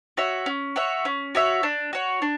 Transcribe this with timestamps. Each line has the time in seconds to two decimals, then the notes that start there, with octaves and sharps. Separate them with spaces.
0.17 F#4 C#5 E5
0.46 C#4
0.76 F#4 C#5 E5
1.05 C#4
1.35 F#4 C#5 E5
1.63 D4
1.93 F#4 C#5
2.22 D4